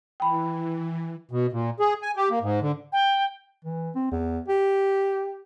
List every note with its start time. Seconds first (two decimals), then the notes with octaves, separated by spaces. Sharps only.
0.20 E3 G5 B5
1.31 B2
1.52 A#2
1.80 G#4
2.02 G#5
2.16 G4
2.30 A#3
2.42 G#2
2.62 D3
2.92 G5
3.65 E3
3.95 C4
4.11 E2
4.48 G4